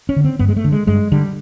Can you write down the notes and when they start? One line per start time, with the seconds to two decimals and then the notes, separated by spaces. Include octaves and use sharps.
0.09 C#4
0.16 D3
0.24 C4
0.39 G2 B3
0.49 G#3
0.56 A3
0.64 D3
0.72 G#3
0.87 G2 G#3
1.12 D3 G3